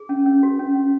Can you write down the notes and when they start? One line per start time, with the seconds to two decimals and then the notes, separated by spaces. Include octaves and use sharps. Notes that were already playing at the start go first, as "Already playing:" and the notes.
Already playing: G#4
0.09 C#4
0.26 C#4
0.43 F#4
0.59 C#4
0.75 C#4